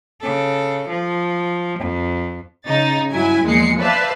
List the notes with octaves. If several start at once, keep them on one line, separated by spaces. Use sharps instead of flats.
C#3 A4
F3
F2
C#3 D#4 A6
G2 F#3 E4 G#5
E2 A#2 F3 G#3 C7 C#7
B4 C5 D5 E5 F5 A5